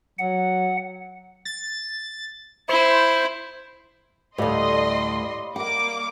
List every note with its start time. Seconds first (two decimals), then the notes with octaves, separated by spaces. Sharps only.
0.19 F#3 F#5
1.45 A6
2.69 E4 C5
4.38 D2 A2 G3 C#5 D#5 F5 C6
5.56 A#3 D#5 F#5 D6